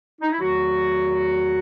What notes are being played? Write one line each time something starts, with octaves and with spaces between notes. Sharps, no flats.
D#4
E4
E2 D#3 F#3 A3 F#4